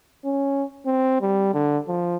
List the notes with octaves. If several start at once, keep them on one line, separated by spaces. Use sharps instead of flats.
C#4
C4
G3
D3
F3